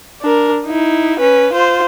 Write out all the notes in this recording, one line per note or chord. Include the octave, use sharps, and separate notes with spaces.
D4 A#4
D#4 E4
C#4 B4
F4 C5